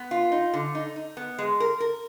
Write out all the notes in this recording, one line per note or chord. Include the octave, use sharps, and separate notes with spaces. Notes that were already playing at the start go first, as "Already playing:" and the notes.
Already playing: B3
F4
D#4
D3
D#4
D#4
B3
G#3
A#4
A#4